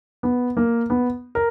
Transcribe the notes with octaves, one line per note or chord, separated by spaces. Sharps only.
B3
A#3
B3
A#4